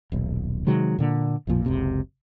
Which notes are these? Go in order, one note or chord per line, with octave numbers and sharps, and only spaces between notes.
D#1 B1
C3 D#3 F#3 G#3
A#2 D3 A#3
A1 F2 A#2 F3
F#1 C#2 C3